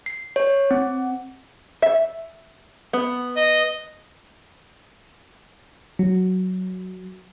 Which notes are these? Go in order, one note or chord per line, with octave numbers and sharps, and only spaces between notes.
C7
C#5
C4
E5
B3
D#5
F#3